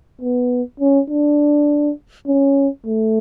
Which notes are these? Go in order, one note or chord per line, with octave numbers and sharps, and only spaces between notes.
B3
C#4
D4
C#4
A3